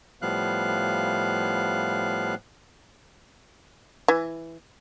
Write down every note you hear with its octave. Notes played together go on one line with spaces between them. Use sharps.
A2 F3 G3 B3 F5 F#6
E3